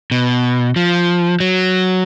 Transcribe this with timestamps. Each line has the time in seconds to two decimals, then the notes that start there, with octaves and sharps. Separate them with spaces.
0.11 B2
0.76 F3
1.40 F#3